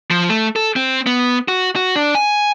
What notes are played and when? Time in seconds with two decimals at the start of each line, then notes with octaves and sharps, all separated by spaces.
0.11 F3
0.29 A3
0.56 A4
0.76 C4
1.06 B3
1.48 F#4
1.76 F#4
1.96 D4
2.15 G#5